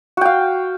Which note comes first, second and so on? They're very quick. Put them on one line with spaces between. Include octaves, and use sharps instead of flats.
F#4 G5 F5